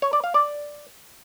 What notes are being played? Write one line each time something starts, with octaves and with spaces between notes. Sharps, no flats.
C#5
D5
F5
D5